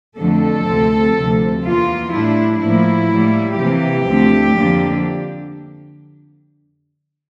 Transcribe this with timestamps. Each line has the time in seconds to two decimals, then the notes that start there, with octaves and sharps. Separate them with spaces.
0.17 F2 D3 A3 A4
0.66 D2 C3 F3 C4
1.14 D2 C3 F3
1.64 E2 E3 A#3 F4
2.12 A2 G3 D4 E4
2.61 A2 F3 A#3 E4
3.09 A2 G3 A#3
3.58 C3 E3 A#3 G4
4.07 D2 D3 F3 A3 C4
4.56 F2 D3 F3 A#3 D4